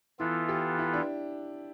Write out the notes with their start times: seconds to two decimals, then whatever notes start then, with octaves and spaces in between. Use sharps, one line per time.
0.19 E3 B3 E4 F4 A4
0.49 G4
0.78 E4
0.93 D4